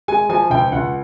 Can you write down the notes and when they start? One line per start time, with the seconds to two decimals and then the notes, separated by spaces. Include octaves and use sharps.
0.08 G#3 G#5
0.29 F3 G#5
0.50 C#2 G5
0.72 C#2 F#5